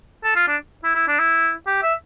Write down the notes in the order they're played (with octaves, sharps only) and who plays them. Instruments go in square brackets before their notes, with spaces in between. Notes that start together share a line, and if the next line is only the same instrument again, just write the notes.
[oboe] A4
F4
D4
E4
E4
D4
E4
G4
E5